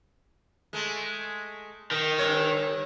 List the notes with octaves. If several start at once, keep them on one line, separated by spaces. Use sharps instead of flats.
G#3 A3
D#3
G2 C#5